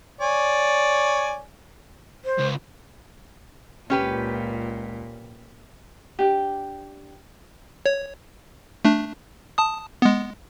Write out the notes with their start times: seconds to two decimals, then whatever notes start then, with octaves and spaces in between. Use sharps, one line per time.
0.21 C#5 D5 G#5
2.25 C5
2.39 C#2
3.90 C#2 A#2 C#4 G4 B4
6.19 D4 G4
7.86 C#5
8.85 A3 D4
9.58 A5 D#6
10.02 G#3 B3